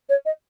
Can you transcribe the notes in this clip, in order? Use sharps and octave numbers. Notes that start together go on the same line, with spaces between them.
C#5
D#5